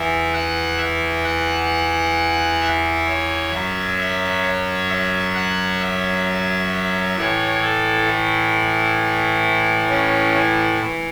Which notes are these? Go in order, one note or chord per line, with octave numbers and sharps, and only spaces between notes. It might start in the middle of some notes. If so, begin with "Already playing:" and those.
Already playing: E2 E3 E5
F#5
E5
F#5
E5
C#5
F#2 F#3 E5
E5
C#5
E5
F#5
E5
A2 E3 C#5
A4
E4
C#4
E4
E3